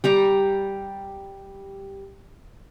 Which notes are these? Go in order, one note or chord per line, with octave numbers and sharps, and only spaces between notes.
G3 G4 A#5 D6